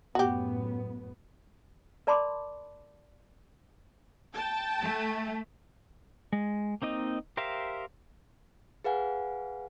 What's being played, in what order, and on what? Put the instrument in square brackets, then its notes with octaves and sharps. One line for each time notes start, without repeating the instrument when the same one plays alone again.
[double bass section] F#2 A2 B3 [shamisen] F#4 G4
[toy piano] A#4 D5 A5 B5 C6 D6
[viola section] G5 A5
[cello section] A3
[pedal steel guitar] G#3
A#3 C4 D#4 D#5
G4 A#4 C5 E5 F5
[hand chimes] G#4 B4 F5 F#5 G#5